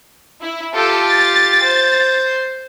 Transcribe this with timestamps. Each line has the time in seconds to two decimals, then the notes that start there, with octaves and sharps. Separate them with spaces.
0.42 E4
0.74 F4 G4 A4
1.07 A6
1.63 C5